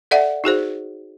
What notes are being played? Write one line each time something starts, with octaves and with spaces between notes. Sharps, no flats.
A4 D5 E5 F#5
D#4 F#4 G#4 C5